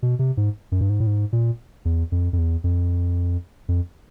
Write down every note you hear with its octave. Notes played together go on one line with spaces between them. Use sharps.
B2
C3
G#2
F#2
G2
G#2
A2
G#2
A#2
E2
F2
F2
E2
F2
F2